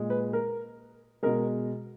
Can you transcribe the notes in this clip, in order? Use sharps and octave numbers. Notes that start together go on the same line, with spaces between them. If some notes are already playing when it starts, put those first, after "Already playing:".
Already playing: A#2 G#3
B4
A#4
B2 G#3 A#4